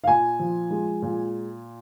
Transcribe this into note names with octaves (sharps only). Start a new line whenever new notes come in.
F5
A#2 G#5
F3
G#3
A#2